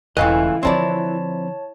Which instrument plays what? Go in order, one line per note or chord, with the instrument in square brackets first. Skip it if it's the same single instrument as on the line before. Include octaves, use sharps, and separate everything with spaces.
[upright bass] E1 [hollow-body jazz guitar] C#2 A2 D#5 [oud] E3 [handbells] F5 G#5 F#6
[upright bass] D3 F3 [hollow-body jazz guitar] C4 E4 D5 [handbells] C#5 A5